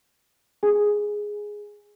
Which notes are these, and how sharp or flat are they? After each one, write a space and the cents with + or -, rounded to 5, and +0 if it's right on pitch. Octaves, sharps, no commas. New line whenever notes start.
G#4 +0 G#5 +0